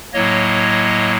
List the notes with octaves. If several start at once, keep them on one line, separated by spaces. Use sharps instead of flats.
A2 F#3 A#3 C#5 D#5